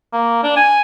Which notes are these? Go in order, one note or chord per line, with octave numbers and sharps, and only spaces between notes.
A#3
D4
G#5